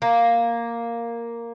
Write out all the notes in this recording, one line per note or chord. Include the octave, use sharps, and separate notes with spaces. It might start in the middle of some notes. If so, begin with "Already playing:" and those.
A#3